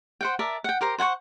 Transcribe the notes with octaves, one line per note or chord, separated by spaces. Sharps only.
C5 F#5 G5
A#4 D5 E5 A5
F#5 G5
G4 A#4 C5 A#5
C5 F#5 G#5 C#6